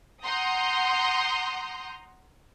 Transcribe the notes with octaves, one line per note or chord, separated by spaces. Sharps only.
F#5 A#5 C6 D#6 G6